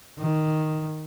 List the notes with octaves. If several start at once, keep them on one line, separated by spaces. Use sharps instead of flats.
D#3